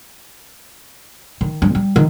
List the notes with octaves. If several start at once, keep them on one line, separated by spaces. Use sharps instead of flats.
D#3
G2
G3
D#3